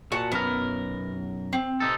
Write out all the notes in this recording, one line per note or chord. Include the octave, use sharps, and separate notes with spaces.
A#2 F#4 A5
B1 F#2 B3 A#4
C4
C3 D#4 A4